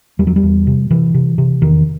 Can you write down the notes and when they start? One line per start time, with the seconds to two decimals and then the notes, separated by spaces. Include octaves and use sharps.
0.19 E2 G3
0.27 F#3
0.36 G3
0.43 E2
0.67 C3
0.90 C3 E3
1.14 C3
1.38 C3
1.61 E2 D#3